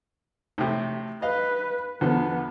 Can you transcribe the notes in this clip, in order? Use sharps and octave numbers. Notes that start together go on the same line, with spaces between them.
A2 C3
B4 D#5 F5
E2 D3 F3 B3